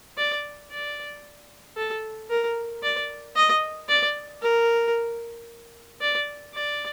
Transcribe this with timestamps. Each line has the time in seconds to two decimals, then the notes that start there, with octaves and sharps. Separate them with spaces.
0.18 D5
0.71 D5
1.77 A4
2.30 A#4
2.83 D5
3.36 D#5
3.89 D5
4.42 A#4
6.01 D5
6.54 D5